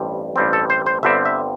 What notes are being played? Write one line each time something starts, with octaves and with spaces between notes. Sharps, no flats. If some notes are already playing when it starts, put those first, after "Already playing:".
Already playing: A1 G2 G3 C4
A1 G2 G3 C4
A4
C5
C5
G1 G2 D3 G3 C4 E5
E5